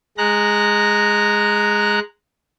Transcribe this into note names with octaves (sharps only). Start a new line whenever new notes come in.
G#3 A#5 F#6